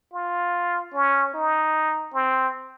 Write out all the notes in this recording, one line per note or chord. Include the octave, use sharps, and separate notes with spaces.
F4
C#4
D#4
C4